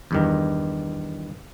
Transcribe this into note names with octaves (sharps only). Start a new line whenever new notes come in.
E2 G2 D#3